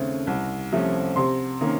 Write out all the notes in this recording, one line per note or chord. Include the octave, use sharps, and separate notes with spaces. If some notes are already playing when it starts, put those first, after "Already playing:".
Already playing: D#2 C#3 A3 C4
C2
C3 F3 A3 C#4
C3 C6
D#3 A#3 C#4